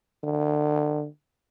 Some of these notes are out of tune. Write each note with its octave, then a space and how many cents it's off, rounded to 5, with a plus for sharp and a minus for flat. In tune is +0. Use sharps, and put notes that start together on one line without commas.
D3 +30